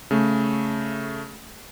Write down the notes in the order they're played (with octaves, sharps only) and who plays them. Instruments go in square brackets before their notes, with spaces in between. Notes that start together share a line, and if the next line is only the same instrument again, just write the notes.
[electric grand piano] C#3 A3